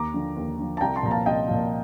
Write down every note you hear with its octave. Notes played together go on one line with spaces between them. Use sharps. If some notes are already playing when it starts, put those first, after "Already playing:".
Already playing: D#2 A#5 D6
D3 F3
D#2
D3 F3
A5
C2 G5 A#5
A5 C6
A#2 F3 A#5
F5 A5
C2 D#5 G5
A#2 F3